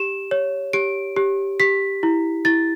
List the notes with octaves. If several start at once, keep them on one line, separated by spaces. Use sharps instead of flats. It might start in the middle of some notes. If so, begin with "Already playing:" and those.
Already playing: G4 E7
C#5
G4 D7
G4
G4 B6
E4
E4 A6